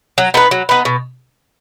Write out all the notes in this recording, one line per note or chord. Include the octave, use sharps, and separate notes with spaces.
F#3
B3 D#4 B4
F#3
B3 D#4 B4
B2